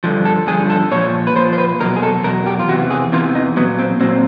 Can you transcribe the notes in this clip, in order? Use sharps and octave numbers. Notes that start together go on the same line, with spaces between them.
G2 D3 F3
A4
G2 D3 F3 G#4
A4
A#2 F3 C#5
B4
A#2 F3 C5
C5
B4
E2 B2 F#3 A#4
G#4
A4
E2 B2 F#3 A#4
G4
F4
E2 C3 E3 F#4
G#4
E2 C3 E3 F4
D#4
A#2 F#3 B3
C4
A#2 F#3 C4